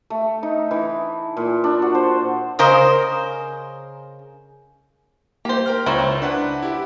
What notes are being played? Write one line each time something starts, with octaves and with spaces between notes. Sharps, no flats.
A3
D#4
E3
A#2
D4
F#4
C5
C#3 A#4 C5 D#5
A#3 G4 C5
A#4 G5 F6
C#2 E4 C5 C#5 A#5
D4 B4 F#5
E4 G4